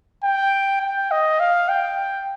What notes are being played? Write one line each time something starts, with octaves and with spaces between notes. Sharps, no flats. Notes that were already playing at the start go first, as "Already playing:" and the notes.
G5
G5
D#5
F5
G5